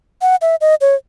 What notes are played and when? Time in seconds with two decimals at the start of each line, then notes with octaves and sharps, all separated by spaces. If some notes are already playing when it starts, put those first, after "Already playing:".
0.22 F#5
0.42 E5
0.61 D#5
0.81 C#5